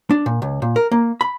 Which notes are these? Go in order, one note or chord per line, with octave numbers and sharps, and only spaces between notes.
D4
A#2
C#2
A#2
A#4
A#3
B5